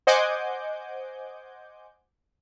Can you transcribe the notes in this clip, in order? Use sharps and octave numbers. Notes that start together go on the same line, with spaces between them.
C5 D#5 F#5 G#5 D6 G6